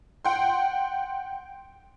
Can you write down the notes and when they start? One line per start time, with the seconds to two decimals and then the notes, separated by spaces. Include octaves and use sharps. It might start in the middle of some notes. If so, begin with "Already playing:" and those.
0.25 F#5 G5 C6